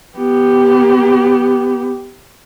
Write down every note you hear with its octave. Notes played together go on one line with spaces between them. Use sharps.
B3 G4